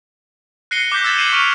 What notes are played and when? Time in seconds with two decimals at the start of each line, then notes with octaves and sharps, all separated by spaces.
0.71 F#6 A#6 C7 C#7 D#7 G7
0.92 D6 F#6 G6 B6
1.04 E6 F#6 G#6 A6 E7
1.17 C7 D#7 F#7
1.33 C#6 F6 D7 D#7 F7